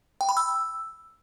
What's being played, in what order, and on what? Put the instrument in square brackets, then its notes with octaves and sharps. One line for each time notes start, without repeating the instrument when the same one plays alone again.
[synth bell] G5
B5
E6